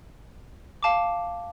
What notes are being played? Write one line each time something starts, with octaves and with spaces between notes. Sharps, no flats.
F5 A5 D6